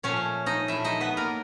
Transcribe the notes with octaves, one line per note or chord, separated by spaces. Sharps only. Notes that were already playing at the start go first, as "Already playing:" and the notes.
A#2 F3 A3 C#4 C#5
D#4 D#5
A#2 F3 A3 E4 E5
D#4 D#5
B3 B4
A#3 A#4